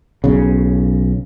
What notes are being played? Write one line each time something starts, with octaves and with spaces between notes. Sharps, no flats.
B1 C#3